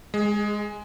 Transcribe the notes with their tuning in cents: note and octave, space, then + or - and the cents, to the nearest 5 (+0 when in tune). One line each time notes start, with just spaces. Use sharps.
G#3 +0 G#4 -35